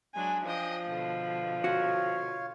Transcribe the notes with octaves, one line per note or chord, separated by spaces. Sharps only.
F#3 G#3 D4 G#5
F3 D4 D#5 G5
B2 D3
F4 F#4 C#5